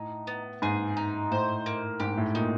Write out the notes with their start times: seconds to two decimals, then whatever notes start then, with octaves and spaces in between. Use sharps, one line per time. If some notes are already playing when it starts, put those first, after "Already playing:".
Already playing: A2 D#4
0.27 B3
0.62 G#2 G#4
0.97 D#4
1.31 A2 C5
1.66 A#3
2.00 G#2 G4
2.17 A2
2.34 A#2 D#4